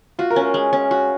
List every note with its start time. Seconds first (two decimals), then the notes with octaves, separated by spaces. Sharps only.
0.19 F4 F#4
0.31 A#4
0.36 C#4
0.42 A#4
0.54 G#3
0.73 C#4
0.91 F#4